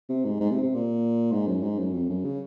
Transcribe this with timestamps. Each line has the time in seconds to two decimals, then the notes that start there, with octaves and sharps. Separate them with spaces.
0.09 C3
0.25 G#2
0.40 G#2
0.51 C3
0.63 C3
0.75 A#2
1.32 G#2
1.48 F#2
1.63 G#2
1.79 F#2
1.94 F2
2.10 F#2
2.25 C#3